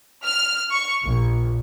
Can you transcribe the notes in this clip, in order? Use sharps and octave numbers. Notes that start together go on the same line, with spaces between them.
F6
C#6
A#1